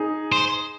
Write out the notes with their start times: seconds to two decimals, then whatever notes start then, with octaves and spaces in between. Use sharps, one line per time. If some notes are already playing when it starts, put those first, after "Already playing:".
Already playing: D#4 G#4
0.32 C5